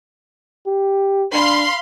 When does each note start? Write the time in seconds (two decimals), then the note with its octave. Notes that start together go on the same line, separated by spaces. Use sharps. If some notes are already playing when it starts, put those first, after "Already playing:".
0.67 G4
1.34 D4 F5 B5 C6